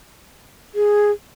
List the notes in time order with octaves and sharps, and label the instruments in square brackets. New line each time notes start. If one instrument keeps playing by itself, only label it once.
[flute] G#4